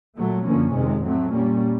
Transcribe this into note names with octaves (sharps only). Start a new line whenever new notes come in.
A#2 F#3 A3
F#2 D3 F3 A#3 C#4
F2 C3 D#3 G#3
A2 F#3 A3 C4
A#2 G3 A#3 C#4